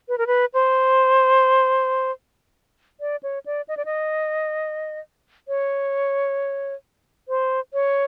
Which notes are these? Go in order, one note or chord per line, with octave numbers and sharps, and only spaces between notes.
B4
A#4
B4
C5
D5
C#5
D5
D#5
D5
D#5
C#5
C5
C#5